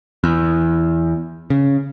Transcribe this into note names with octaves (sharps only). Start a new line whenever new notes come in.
E2
C#3